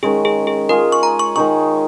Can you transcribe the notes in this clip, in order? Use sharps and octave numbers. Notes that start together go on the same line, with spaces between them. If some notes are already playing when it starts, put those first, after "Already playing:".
D#3 G#3 C#4 G#4
G#4
G#4
G#3 F4 G#4 A#4
C#6
A#5
C#6
D#3 G#3 D#4 G#4 C#6